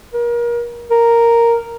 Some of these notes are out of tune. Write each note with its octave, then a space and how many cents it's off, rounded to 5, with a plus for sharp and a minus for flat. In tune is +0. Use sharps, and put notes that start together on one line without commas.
A#4 +30
A#4 +0